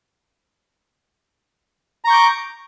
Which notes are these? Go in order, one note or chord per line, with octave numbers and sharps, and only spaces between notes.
A#5 C#6 D6 G6